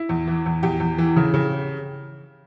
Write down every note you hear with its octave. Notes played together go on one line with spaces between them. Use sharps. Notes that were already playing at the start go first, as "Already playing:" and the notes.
Already playing: E4
E2
E3
E2
E2 G4
E2
E3
C#3
C#3